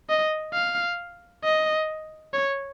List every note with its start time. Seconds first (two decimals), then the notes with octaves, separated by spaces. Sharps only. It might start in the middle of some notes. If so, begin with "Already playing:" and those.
0.09 D#5
0.54 F5
1.44 D#5
2.33 C#5